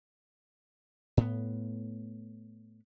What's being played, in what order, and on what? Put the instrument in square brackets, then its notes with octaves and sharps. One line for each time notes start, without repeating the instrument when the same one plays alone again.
[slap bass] A2 B3